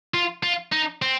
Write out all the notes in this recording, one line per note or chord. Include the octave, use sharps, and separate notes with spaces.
F4
F4
D#4
C4